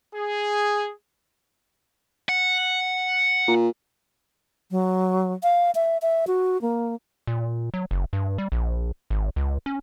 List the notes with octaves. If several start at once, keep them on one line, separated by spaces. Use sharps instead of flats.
G#4
F#5
A#2
F#3
F5
E5
E5
F#4
A#3
A#2
F#3
F#1
G2
G3
A#1
G#1
C#2
C#4